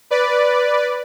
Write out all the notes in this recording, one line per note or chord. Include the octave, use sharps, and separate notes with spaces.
B4 D5